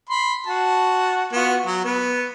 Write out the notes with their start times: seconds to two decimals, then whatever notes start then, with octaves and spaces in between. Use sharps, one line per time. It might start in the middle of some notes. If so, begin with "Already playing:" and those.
0.09 B5 C6
0.46 F#4 A5
1.33 B3 F4 F#4
1.66 F#3
1.85 B3 B4